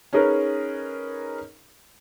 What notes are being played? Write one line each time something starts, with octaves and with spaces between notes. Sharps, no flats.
C#4 D#4 G#4 A#4 B4